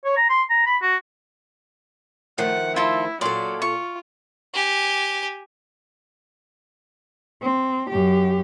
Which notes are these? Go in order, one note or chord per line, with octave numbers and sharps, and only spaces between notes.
C#5
A#5
C6
A#5
B5
F#4
D#3 F3 A3 F#5
E4 F4 A4
A#2 F#3 A4 D5 F5 C6
F4 C#6
G4 G#5
C4
F#2 G4